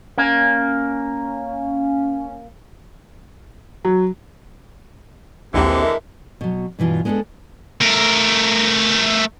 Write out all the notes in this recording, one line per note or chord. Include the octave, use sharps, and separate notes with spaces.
A#3 C#4
F#3
A#1 D#2 D3 E3 G#3 C4 G4
A#4 E5
B2 F#3
G2 B2 E3 F4
G#3 B3 D4 G#4 A4
A3 A#4